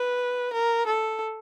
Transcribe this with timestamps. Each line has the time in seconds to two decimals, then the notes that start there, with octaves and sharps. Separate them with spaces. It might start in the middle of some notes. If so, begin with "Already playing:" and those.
Already playing: B4
0.53 A#4
0.87 A4